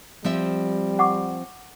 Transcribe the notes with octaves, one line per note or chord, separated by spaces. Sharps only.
F3 G3 C4 E5
F#5 C#6 D6